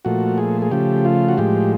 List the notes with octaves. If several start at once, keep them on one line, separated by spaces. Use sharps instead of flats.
A#2 F3 A3 F#4
G#4
G#4
C#3 F3 A3 G4
F4
F#4
A2 F3 G#3 G4